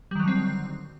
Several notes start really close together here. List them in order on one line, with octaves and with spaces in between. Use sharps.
G3 D#3 F#3 D3 C4